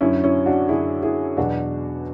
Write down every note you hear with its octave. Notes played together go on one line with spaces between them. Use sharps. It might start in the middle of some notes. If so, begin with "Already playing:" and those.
F#2 D3 F#3 C#4 E4
C#4 E4
D4 F#4
F#2 D3 F#3 E4 G#4
E4 G#4
E2 B2 F#3 D4 F#4